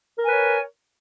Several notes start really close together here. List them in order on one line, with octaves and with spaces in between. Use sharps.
A#4 G#5 B4 C#5